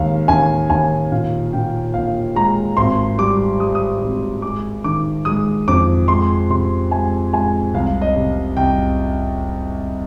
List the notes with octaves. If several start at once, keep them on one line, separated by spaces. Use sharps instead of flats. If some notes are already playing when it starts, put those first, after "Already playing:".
Already playing: D#2 G#3 F5
D#2 G#5
D#2 G#5
A#2 F5
A#2 G5
A#1 F5
G#3 A#5
G#1 C6
G3 D6
G3 D#6
D#6
G#1
G#3 D6
D#3 D6
G#3 D#6
F2 D6
G#3 C6
C3 C6
G#3 G#5
G#3 G#5
C2 F5
D#5
C3
C2 G5